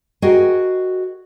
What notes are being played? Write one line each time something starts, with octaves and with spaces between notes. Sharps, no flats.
F#4 G#4 A#4 D#5 G5